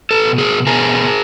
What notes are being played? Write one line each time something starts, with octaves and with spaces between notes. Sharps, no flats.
A4 B4
B2
G#4 A#4
B2 G#4 A#4